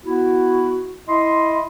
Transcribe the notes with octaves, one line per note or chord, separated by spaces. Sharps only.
B3 E4 F#4
E4 D#5 C6